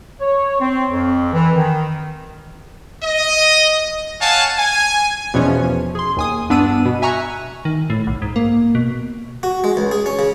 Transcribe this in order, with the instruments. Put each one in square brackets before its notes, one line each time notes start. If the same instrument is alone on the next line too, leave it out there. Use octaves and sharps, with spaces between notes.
[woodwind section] C#5
C4
F2
E3
D#3
[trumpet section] D#5
C#5 F5 F#5 G#5 A5
G#5
[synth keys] E2 B2 F3 C#4
G#4 C6
D#2 G#5 D#6
G2 B3 D4 E6 D#7
B2
E5 G#5 A#5 C#6 E6 F#6
[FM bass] D#3
A2
B1
G#2
A#3
B2
[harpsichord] F#4
G#3
C#2
G#4
C#4
C#3